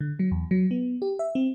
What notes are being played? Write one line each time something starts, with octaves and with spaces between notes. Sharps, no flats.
D3
F#3
E2
F#3
B3
G4
E5
C4